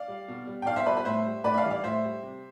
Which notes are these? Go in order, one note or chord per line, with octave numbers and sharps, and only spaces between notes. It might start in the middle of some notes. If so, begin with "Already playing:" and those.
Already playing: D5 F5
G3
B2
G3
G5
B2 D5 F5
C5 E5
G3 B4 D5
B4
A2 C5 E5
G3
A2 B4 D5
E5
D5 F5
E3 G3
D5 F5
A2 C5 E5
G3
C3